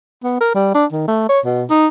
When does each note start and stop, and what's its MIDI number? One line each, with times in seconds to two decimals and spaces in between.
0.24 0.38 59
0.41 0.51 70
0.55 0.72 55
0.74 0.85 62
0.92 1.03 51
1.08 1.27 57
1.29 1.40 73
1.45 1.64 47
1.70 1.87 63